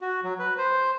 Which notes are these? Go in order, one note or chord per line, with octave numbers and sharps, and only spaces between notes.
F#4
F#3
B4
C5